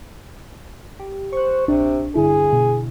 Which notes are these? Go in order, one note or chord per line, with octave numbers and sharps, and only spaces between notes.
G4
C5 C#6 F#6
A#1 C3 D4
G2 D3 E4 G#4
B2